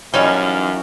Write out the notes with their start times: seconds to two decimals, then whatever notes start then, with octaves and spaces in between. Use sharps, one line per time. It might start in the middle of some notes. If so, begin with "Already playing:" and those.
0.14 F#2 E3 G3 C#4 D#4 F5